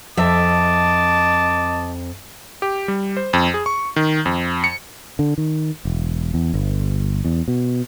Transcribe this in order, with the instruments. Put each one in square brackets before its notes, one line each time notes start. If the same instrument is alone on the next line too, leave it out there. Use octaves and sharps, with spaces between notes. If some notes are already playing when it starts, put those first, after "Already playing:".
[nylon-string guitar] F2 E5 [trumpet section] D#5 A5 D6
[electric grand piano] G4
G3
C5
F2
G#4
C#6
D#3
F2
C#7
[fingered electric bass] D3
D#3
E1
E2
G1
E2
B2